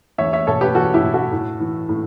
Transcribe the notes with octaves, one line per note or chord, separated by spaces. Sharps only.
E2 C#5 E5
C#5 E5
B2 A4 C#5
G4 B4
E2 F#4 A4
E4 G4
B2
F#4 A4
A2
E3
A2